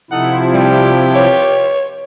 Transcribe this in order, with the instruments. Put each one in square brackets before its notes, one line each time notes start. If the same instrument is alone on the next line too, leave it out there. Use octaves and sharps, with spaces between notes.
[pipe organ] C3 F3 E4 [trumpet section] D#4 A4 F#5
[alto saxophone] G3 [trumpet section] F4 G4
[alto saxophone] C#5